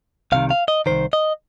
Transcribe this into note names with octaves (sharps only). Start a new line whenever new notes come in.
C2 C3 D#3 F5
F5
D#5
C2 C3 D#3 C5
D#5